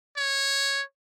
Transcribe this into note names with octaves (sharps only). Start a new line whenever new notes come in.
C#5